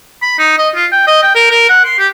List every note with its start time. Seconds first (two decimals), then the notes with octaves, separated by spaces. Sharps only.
0.22 B5
0.39 D#4
0.58 D#5
0.75 F4
0.92 G5
1.07 D#5
1.23 G5
1.35 A#4
1.51 A#4
1.69 F#5
1.85 C6
1.98 G4